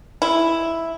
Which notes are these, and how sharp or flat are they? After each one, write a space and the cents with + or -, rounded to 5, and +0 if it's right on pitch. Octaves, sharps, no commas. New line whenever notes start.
G#3 +0 E4 +0